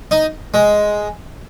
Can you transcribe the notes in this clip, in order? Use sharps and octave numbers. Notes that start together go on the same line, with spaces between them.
D#4
G#3